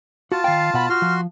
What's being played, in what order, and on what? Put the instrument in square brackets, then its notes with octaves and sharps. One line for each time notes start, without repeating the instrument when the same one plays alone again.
[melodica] F4 A5 [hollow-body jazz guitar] F#4
[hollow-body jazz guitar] D#3 G5 [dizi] F5
[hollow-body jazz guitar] B2 F#5 [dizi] B5
[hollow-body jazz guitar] F4 [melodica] F#4 C6 [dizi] F6
[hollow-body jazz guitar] F3